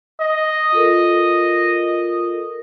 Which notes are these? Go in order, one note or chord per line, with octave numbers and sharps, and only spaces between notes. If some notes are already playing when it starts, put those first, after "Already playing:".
D#5
F4 A4 A#4